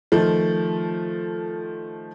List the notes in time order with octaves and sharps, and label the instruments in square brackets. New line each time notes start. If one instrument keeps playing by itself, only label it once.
[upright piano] D#3 F3 A3